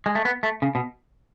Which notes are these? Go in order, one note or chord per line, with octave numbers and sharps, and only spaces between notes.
G#3
A3
B3
A3
C#3
B2